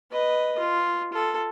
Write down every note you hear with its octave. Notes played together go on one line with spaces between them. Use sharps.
B4 D#5
F4
F4 A4